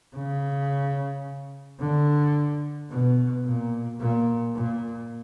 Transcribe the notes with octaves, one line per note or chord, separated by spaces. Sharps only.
C#3
D3
B2
A#2
A#2
A#2